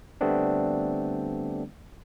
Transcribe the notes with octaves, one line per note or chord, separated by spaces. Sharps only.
D3 G3 A3 B3 C4 D4